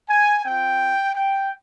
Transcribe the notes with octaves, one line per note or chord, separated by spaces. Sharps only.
G#5
C4 F4 G5
G5